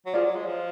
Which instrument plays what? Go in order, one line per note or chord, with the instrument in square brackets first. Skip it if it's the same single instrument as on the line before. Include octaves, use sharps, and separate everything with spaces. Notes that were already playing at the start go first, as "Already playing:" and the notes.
[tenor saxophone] F#3
[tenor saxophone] F3 [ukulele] F4 G#4 D5
[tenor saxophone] F#3
G#3
F3